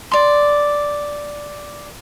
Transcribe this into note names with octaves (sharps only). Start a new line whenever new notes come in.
D5 C6